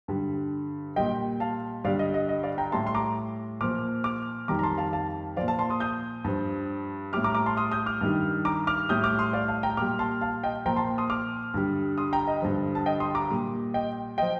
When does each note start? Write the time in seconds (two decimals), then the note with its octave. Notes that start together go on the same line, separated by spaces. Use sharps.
0.08 G2 D3 G3
0.96 A#2 G3 D#5 G5
1.40 F5 A5
1.84 G2 D3 G3 D5 F5
1.99 D#5
2.14 D#5
2.29 D#5
2.43 D5 F5
2.58 G5 A#5
2.72 A2 G3 A5 C6
2.87 C6
2.95 A#5 D6
3.61 A#2 F3 D6 F6
4.04 D6 F6
4.48 F2 D#3 G3 A#5 D6
4.59 A#5
4.63 A5 C6
4.78 F5 A5
4.92 F5 A5
5.37 F3 D5 F5
5.41 A#2
5.48 F5 A5
5.59 A5 C6
5.70 C6 D#6
5.80 D#6 G6
6.24 G2 F3
7.13 G3 D6 F6
7.17 A2
7.24 A#5 D6
7.35 A#5 D6
7.46 A5 C6
7.57 C6 D#6
7.72 D#6 G6
7.86 D6 F6
8.01 G2 D#3 G3
8.45 A#5 D6
8.67 D6 F6
8.89 A2 G3 D#6 G6
9.04 D6 F6
9.19 C6 D#6
9.33 D5 F5
9.48 F5 A5
9.63 G5 A#5
9.77 A#2 G3 D6 F6
9.99 A5 C6
10.21 F5 A5
10.43 D#5 G5
10.66 A#2 F3 G5 A#5
10.76 A5 C6
10.98 C6 D#6
11.10 D6 F6
11.54 G2 D3 G3
11.98 C6 D#6
12.13 G5 A#5
12.27 D#5
12.42 G2 D3 F3
12.75 A5
12.86 D#5 G5
13.00 C6 D#6
13.15 A#5 D6
13.30 A#2 G3
13.74 D#5 G5
14.18 F3 D#5 G5